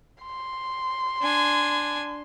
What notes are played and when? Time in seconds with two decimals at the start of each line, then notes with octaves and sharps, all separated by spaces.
0.23 C6
1.22 D4 G#5